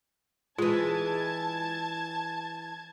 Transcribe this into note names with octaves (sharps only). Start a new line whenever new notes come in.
E3 G#3 F4 A5 G#6